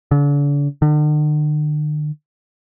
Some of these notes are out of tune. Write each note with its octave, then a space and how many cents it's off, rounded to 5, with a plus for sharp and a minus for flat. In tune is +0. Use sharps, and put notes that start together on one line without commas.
D3 -40
D3 +45